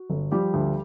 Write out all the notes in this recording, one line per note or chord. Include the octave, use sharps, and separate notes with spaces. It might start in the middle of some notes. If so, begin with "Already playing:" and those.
Already playing: F#4
G1
F3 G3 G4
D2